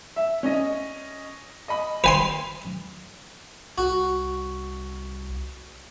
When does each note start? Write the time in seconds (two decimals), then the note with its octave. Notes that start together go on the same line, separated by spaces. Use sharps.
0.16 E5
0.43 C#4 D#5
1.68 D#5 B5
2.04 B4 G#5 C6 F7
3.78 C2 F#4